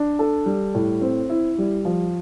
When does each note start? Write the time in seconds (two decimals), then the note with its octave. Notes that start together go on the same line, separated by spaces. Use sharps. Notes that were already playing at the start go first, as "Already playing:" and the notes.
Already playing: D4
0.19 A4
0.46 G3
0.75 A2
1.01 C4
1.30 E4
1.58 G3
1.85 F3